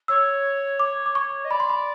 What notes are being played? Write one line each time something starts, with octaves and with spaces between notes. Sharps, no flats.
C#5 E6
D6
D6
C#6
D#5
D5 B5
C6
B5